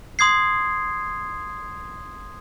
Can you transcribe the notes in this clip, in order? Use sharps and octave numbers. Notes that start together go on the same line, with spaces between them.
C6 D#6 G#6 C7